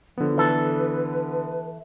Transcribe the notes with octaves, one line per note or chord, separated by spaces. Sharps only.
D3 F3 B3
E3 A4 B4